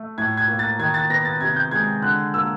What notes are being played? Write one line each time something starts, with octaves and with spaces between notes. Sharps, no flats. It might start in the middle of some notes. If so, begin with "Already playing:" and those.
Already playing: A3
A2 G#6
G#6
A#3
A6
D#3 G#6
A6
B3 A#6
A6
C3 G#6
G6
G#3 G#6
D3 F#6
A#3 E6